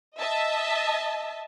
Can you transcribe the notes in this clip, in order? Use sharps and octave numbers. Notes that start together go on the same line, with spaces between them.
D#5 E5 A5